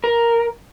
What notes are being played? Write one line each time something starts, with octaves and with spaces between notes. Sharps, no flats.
A#4